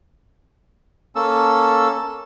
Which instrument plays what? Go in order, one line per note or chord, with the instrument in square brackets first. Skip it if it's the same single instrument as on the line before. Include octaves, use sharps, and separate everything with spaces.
[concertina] A#3 C#4 A4 E6